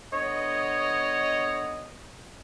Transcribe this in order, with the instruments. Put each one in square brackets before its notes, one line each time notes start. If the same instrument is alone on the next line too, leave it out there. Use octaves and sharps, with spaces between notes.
[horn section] D3 B3 D#5 [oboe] C#5